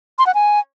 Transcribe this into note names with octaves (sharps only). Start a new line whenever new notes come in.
C6
F#5
G#5